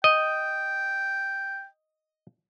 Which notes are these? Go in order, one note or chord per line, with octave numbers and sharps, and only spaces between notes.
D#5 G5